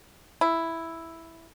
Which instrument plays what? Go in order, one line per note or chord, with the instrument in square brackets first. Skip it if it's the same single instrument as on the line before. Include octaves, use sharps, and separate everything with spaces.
[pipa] E4